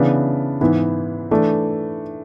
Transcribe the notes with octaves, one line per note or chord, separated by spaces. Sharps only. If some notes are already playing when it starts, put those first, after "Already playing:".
Already playing: C#3 E3 B3 D4
G#2 E3 B3
E3 A3 D4